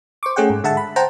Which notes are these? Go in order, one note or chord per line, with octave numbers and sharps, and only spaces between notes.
C5 C#6 D6
A3 C#4 G#4 F#5 G5
G#2
D3 G#3 E5 F#5 A5
B5
C5 F#5 G5 A5 A#5